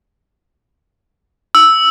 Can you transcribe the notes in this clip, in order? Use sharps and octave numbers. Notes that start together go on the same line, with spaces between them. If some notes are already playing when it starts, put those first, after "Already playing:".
E6